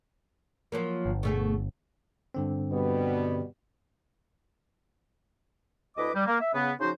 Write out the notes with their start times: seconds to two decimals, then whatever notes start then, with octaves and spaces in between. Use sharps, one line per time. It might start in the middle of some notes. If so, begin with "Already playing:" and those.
0.72 F3 F#3 A#3
1.06 G1
1.23 B2 A3 G#4
2.34 G2 D3 C4
2.71 B2 G3 B3
5.97 D2 E4 B4 D#5 D6
6.14 G3
6.26 A#3
6.40 E5
6.54 C#3 B3
6.79 C#3 F3 D#4 F#4 C5